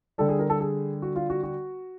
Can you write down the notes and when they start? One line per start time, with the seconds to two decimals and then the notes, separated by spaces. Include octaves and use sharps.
0.18 D3 G3 A4
0.29 G#4
0.39 A#4
0.50 A4
0.60 G#4
1.02 F#4
1.16 F4
1.30 F#4
1.43 F#4